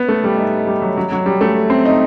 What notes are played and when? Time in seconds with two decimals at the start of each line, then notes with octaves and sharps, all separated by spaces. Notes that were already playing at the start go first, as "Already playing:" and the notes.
Already playing: B3
0.09 A3
0.24 G3
0.38 D#4
0.67 G3
0.82 F#3
0.97 F#3
1.12 F#3
1.26 G3
1.41 A3
1.70 C4
1.85 D#4